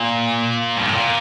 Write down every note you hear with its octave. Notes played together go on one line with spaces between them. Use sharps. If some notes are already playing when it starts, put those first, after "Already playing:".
Already playing: A#2
G2
A2
A#2